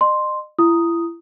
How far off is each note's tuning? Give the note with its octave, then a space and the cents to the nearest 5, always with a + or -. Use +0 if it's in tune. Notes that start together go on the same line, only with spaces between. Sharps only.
D#5 -40 C6 +0
E4 +35 A#5 +0 D#6 +0